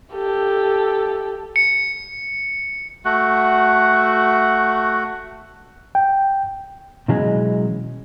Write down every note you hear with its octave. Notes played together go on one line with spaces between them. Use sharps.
G4 A4
C#7
A3 F#4 F#5
G5
B2 E3 F#3 G#3 C#4 G#4